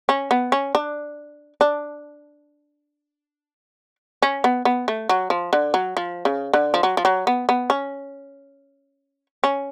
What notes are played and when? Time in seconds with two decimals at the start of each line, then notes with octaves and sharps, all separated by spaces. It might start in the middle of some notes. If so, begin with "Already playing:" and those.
0.09 C#4
0.31 B3
0.52 C#4
0.75 D4
1.61 D4
4.22 C#4
4.44 B3
4.65 B3
4.88 A3
5.09 F#3
5.30 F3
5.53 D3
5.74 F#3
5.97 F3
6.25 C#3
6.54 D3
6.74 F3
6.83 F#3
6.97 F3
7.05 F#3
7.27 B3
7.49 B3
7.70 C#4
9.44 C#4